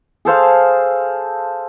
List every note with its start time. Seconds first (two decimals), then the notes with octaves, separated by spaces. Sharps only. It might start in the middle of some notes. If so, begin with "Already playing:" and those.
0.25 G#4 A4 C5 F5